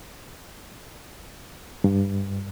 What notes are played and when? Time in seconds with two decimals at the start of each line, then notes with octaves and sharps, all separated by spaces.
1.84 G2